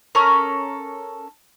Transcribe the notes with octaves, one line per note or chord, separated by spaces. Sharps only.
C#4 A4 A#4